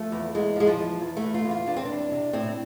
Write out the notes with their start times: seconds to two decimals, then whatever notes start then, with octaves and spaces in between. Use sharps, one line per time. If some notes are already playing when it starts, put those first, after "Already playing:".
Already playing: F3 A3
0.12 E2
0.34 E2 G#3
0.56 F3
0.60 G#3
0.67 F3
0.78 E2
1.01 E2
1.17 A3
1.22 E2
1.34 F4
1.45 E2
1.51 F4
1.66 E2 D4
1.76 C4
1.85 E2 D4
2.11 C3
2.33 A2 C4